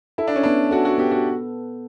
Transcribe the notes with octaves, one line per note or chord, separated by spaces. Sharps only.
E4 A4
D4
C#4
B3 D4
F#4 A4
F#4
B3 G4
F#4